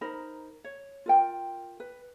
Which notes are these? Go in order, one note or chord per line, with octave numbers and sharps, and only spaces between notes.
D#4 A#4 C5 B5
C#5
F4 A#4 G5
B4